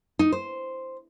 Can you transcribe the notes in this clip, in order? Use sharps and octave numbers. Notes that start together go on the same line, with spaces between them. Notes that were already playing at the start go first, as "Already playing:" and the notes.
D#4
C5